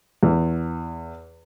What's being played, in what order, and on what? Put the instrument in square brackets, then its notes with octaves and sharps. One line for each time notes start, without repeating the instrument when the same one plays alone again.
[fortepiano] E2